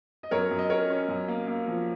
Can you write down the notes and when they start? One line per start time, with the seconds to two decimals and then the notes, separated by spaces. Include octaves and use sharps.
0.23 D#5
0.31 F#2 A#4 C#5
0.51 F#2
0.59 D#5
0.70 C#4 A#4 C#5
0.90 C#4
1.09 F#2
1.28 A#3
1.48 A#3
1.68 F3